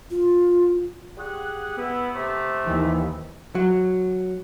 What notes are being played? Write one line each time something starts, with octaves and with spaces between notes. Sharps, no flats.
F4
G4 G#4 F#5
B3 E4
C3 A3
D#2 D#3 E3
F#3